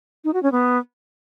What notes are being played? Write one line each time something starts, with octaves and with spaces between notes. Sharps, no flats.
D#4
F#4
C#4
B3